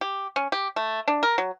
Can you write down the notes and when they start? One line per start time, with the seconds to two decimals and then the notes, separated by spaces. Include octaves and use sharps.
0.01 G4
0.36 C#4
0.52 G4
0.76 A3
1.08 D4
1.23 A#4
1.38 F#3